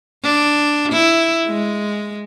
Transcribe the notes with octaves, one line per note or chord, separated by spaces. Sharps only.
D4
E4
G#3